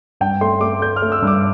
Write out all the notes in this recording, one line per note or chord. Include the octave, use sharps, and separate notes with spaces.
G2 G5
A3 C6
A3 D6
A3 G6
F6
A3
E6
G2
D6